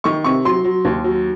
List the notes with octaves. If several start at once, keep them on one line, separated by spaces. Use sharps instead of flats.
D#3 C#6
C3 C#6
F#3 C6
F#3
D#2
F#3